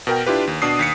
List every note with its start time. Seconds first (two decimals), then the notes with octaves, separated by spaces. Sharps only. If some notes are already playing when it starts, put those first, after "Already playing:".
0.07 B2 A#4 G5
0.26 D4 E4 F4 G4 B4
0.47 D#2
0.62 B2 D4 D#6 C7
0.79 D#2 B6 C#7